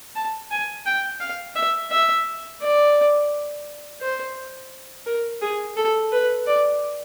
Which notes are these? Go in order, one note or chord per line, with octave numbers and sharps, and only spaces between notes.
A5
G#5
G5
F5
E5
E5
D5
C5
A#4
G#4
A4
B4
D5